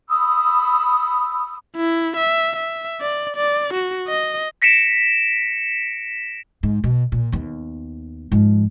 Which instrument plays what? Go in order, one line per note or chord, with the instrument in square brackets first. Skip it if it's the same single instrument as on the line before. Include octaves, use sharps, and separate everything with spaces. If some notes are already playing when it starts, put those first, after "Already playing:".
[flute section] B5 D#6 E6
[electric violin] E4
E5
E5
D5
D5
F#4
D#5
[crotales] A#6 B6 C#7 D7 E7
[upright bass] G#2
B2
A#2
D#2 B3
G#2 F3